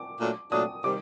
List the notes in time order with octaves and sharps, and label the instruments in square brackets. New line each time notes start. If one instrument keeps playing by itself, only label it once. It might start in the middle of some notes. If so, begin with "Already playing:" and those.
Already playing: [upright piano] D6
[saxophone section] A#2 F#3 A3 D4
[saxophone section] A#2 F#3 A3 D4 [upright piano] D#6
[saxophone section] C3 D#3 G3 [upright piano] D6